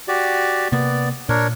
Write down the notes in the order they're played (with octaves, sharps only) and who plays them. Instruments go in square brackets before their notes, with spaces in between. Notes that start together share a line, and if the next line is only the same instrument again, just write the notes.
[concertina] F#4 G4 D5
[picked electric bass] C3 A#3 [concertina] B3 D5
[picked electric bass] A#2 [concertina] D4 A#4 C#5